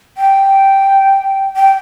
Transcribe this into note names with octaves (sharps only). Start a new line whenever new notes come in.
G5
G5